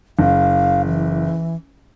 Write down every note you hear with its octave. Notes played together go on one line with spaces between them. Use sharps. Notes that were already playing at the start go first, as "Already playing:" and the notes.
F#1 F5
E3